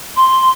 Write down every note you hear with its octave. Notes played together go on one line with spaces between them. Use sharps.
C6